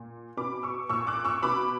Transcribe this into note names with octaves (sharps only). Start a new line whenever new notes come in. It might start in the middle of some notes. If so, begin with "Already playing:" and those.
Already playing: A#2
B2 B5 D6
C#6 E6
A#2 C#6 E6
D6 F#6
C#6 E6
B2 B5 D6